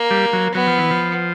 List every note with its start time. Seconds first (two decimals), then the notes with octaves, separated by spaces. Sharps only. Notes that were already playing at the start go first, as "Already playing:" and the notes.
Already playing: A#3
0.11 G3
0.33 F#3
0.55 F#3 B3
0.67 F3
0.78 E3
0.91 F3